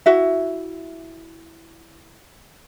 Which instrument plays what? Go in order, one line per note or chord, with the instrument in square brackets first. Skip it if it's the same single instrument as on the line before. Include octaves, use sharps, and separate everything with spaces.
[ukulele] E4 F#4 E5